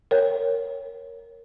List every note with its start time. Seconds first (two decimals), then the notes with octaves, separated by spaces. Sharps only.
0.11 A#4 C#5